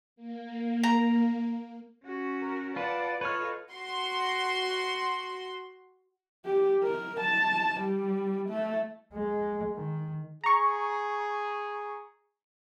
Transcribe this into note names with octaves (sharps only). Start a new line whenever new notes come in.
A#3
A#5
C#4 F#4
A#4
F4 B4 D5 F#5 A5
F4 A4 B4 C#5 D#5 F6
F#4 C6
G4
A#4
A5
G3
A3
G#3
D#3
G#4 A#5 C#6